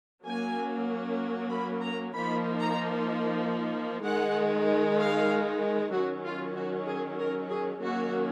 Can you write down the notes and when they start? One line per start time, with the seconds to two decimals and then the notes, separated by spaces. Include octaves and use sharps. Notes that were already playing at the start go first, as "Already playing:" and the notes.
0.24 F#3 A#3 C#4 G#5
1.51 B5
1.82 A#5
2.13 F3 A#3 D#4 B5
2.60 A#5
4.02 D#3 G#3 D#4 F#5
4.98 F5
5.91 D#3 F#3 C#4 F#4
6.24 F4
6.55 F#4
6.87 G#4
7.18 A#4
7.49 G#4
7.81 D#3 F#3 A#3 C#4 F#4